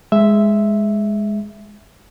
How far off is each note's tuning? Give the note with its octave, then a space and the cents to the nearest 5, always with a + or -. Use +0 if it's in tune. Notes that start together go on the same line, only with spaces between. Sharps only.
G#3 +0 E5 +0